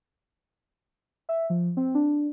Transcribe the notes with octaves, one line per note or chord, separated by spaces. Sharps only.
E5
F3
C4
D4